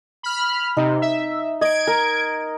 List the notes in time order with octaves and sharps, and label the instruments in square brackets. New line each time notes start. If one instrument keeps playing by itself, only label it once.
[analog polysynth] B5 F6
[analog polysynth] C3 [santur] D#4
[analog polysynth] E5
[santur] D#5 [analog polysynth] G#6 D7
[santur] A#4